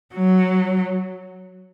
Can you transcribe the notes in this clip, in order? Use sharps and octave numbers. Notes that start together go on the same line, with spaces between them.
F#3